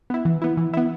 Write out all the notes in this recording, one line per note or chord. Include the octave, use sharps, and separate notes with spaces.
B3 E4
E3
B3 E4
E3
B3 E4